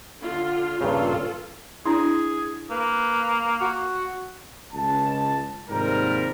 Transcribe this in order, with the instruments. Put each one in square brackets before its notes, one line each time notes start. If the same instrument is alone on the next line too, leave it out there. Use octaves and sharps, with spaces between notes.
[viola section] D3 F4
[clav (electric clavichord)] G2 A#2 C#3 [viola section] F4 A4
[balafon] D4 E4 [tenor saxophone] G#4
[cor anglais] A#3 [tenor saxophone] B4
[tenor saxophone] F#4
[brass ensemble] C#2 A5
D#2 G#2 C3 F3 G3 A#4